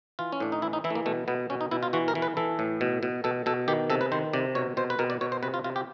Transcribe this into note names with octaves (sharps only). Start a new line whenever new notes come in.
E3 F4
C#4
A2 D4
D#4
E3 E4
D#4
E3 E4
A3
A#3
B2 A3
B2 B3
B2 C#4
D#4
B2 E4
F4
E3 F#4
A#4
E3
B4
E3 A4
A2
B2
B2
B2 A4
B2 A4
D#3 G4
C3 A4
B4
D#3 C5
C3 D5
B2 C#5
B2 C5
B4
B2 A#4
D5
B2 C#5
C5
C3 B4
F4
C3 F4
G4